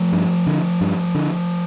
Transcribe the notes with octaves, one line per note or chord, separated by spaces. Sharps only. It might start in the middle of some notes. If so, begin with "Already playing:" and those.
Already playing: F3 A3
G2
D3
G2
D3